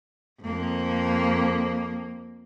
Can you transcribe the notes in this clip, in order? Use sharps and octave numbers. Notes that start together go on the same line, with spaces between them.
F2 A#3